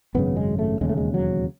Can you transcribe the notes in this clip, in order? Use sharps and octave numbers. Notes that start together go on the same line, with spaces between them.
G#1 F#2 C#3 B3
G#3
A3
E1 D#2 C#3 G#3
A3
G#3
F#3